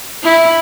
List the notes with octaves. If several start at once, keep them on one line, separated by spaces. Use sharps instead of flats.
E4